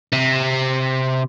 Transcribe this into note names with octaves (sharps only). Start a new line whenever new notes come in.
C3